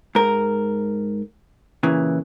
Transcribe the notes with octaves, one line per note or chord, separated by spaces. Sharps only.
G#2 A#4
A#2 C#3 E3